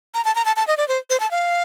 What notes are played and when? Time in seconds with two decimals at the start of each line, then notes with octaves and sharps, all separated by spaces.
0.14 A#5
0.25 A5
0.35 A#5
0.45 A5
0.56 A5
0.67 D#5
0.77 D5
0.88 C5
1.10 C5
1.20 A5
1.31 F5